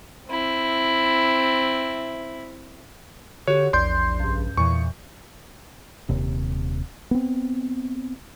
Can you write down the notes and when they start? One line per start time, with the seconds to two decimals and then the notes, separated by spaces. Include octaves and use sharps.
0.28 C4 E4
3.47 D3 F#4 G4 C#5
3.73 A#1 E2 D5 C6 G6
4.20 C#2 G2
4.57 E2 A#2 E3 C#6
6.09 D#1 D#2 C3
7.11 B3 C4